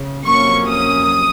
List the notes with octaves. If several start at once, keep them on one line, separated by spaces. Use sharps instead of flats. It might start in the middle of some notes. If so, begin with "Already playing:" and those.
Already playing: C#3
F2 C3 F#3 A#3 C#4 C#6
D#6